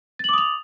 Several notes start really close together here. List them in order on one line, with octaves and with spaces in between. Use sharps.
A6 F#7 D6 D#6 F7